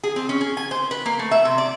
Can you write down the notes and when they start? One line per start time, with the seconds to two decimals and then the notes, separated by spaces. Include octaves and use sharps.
0.03 G#4
0.16 C4
0.29 C#4
0.41 G#4
0.57 G#5
0.71 C5
0.91 B4
1.06 A#3
1.19 A3
1.31 E5
1.45 C3
1.58 D5